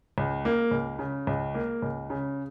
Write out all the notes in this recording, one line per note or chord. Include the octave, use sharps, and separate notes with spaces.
C#2
A#3
C#2
C#3
C#2
A#3
C#2
C#3